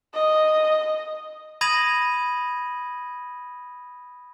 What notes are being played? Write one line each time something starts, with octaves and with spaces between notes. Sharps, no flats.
D#5
B5 D#6 G#6 A#6 D#7 F#7